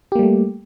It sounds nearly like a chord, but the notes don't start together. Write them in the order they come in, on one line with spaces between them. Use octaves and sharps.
G4 A#3 G3 A3